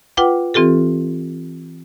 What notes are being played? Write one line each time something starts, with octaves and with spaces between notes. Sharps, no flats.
F4 B4 F#5 G5 D6
E3 C4 F4 G4 A4